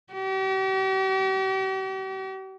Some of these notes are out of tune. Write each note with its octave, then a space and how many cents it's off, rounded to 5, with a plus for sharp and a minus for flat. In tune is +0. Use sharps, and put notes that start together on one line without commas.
G4 -45